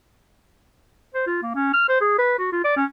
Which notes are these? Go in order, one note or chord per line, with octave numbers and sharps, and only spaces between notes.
C5
F4
A#3
C#4
F6
C5
G#4
B4
F#4
F4
D5
C#4